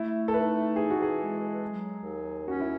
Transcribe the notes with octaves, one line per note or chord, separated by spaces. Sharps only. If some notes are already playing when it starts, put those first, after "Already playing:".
Already playing: A3 E4
A4
D#4 B4
E3 G#4
F#4
G#4
G#3
F#3
D#2
C#4 F#4
E4